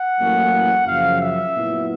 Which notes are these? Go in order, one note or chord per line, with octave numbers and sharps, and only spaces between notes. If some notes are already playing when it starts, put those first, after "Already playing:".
Already playing: F#5
A1 A2 F#3 A#3 C#4
F#2 C#3 F3 F5
E5
A#2 F#3 B3 E4